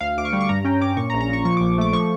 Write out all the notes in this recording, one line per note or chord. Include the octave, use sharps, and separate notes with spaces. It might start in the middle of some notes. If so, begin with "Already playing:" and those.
D2 F5
D2 D6
C#6
G3
C#6
G2 A#5
C#4 G5
C#4 D6
A#2 C#6
A#5
A#1
A#5
A#2 C#6
F3 C#6
A#1 D6
A3 D6
F3 C#6